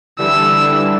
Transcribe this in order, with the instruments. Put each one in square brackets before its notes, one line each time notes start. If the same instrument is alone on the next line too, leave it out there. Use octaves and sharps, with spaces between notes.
[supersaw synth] D3 E3 G3 [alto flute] D4 [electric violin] E6